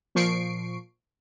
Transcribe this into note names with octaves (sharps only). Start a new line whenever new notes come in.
A#2 F3 C#6 C7 D7